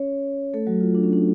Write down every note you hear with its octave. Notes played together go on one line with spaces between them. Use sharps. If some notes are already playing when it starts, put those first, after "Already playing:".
Already playing: C#4 C#5
A3 A4
F#3 F#4
F4
D4
C#4
D4